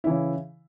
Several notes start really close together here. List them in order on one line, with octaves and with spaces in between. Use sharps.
E4 E3 C#3